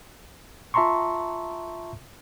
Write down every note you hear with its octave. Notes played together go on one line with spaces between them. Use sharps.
F4 E5 A5 A#5 C6 C#6